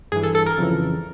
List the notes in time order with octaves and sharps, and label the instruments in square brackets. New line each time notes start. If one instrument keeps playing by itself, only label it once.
[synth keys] G2 E3 G#4
A4
A4
A#4
F2 C#3 E3